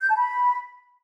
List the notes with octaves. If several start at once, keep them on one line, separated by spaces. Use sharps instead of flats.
G6
A5
B5